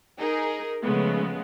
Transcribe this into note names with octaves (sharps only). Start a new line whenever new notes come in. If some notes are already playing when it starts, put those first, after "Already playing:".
D#4 G#4 A#4
C#3 F3 G#3 A3 B3